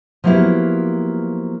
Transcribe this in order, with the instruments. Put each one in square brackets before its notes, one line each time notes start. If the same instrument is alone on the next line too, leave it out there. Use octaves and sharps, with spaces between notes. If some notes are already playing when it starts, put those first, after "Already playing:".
[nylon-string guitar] F3 F#3 A#3 B3 E4 G4